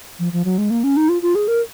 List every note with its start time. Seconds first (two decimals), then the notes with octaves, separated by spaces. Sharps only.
0.19 F3
0.33 F3
0.45 F#3
0.58 G#3
0.70 A#3
0.84 C#4
0.97 D#4
1.09 F4
1.22 F4
1.35 G#4
1.48 A#4